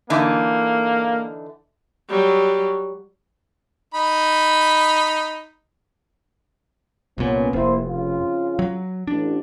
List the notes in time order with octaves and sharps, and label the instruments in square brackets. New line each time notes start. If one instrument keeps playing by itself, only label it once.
[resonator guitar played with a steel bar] D3 E3 D#4 [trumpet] A#3
[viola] F#3 G3
[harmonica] D#4 B5
[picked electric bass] C2 A#2 [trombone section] B3 C#4
[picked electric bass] F1 [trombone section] A#3 E4 C5
[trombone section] F2 C#3 F4
[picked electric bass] F#3
[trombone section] A1 [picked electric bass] D4